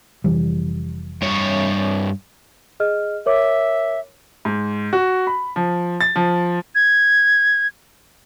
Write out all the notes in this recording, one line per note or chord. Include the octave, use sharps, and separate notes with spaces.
F1 E3 G3
G2 C#5
G#4 D#5 F6
A#4 C#5 E5 D6
G#2
F#4
B5
F3
A6
F3
G#6